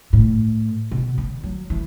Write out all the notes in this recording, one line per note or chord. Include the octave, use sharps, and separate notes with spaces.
A2
B2
D3
F#3
E3